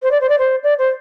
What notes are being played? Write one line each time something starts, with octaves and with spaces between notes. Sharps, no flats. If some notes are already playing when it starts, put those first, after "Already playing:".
C5
D5
C5
D5
C5
D5
C5